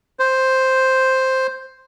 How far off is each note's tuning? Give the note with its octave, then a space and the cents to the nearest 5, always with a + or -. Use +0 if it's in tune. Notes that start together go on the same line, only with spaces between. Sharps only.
C5 +0